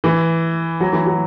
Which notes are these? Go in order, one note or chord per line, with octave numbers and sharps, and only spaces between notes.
E3
F#3
E3
F#3